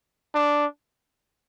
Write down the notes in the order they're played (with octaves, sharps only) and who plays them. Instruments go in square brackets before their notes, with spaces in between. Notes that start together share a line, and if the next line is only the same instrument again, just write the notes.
[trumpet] D4